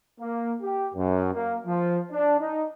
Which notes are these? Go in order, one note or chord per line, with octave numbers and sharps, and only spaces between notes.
A#3
G4
F#2
A#3
F3
D4
D#4